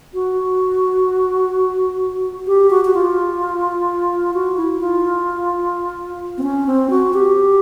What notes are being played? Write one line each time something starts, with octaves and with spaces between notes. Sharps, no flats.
F#4
G4
F#4
F#4
F4
F#4
E4
F4
C4
C#4
C4
F#4
G4